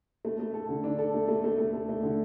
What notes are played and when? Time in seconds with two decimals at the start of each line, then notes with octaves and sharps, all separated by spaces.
0.25 A3
0.39 A3
0.54 A4
0.69 D3
0.84 D4
0.99 A4
1.14 A3
1.28 A3
1.44 A3
1.58 A3
1.74 A3
1.89 A3
2.03 D3